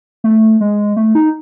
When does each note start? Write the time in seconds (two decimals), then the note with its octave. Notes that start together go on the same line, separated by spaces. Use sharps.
0.24 A3
0.61 G#3
0.96 A3
1.15 D#4